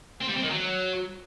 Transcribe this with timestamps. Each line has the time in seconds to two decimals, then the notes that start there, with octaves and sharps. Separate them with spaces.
0.21 C4
0.28 G3
0.35 C4
0.43 D#3
0.50 F#3